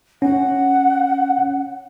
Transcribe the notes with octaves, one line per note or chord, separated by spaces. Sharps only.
C#4 F#5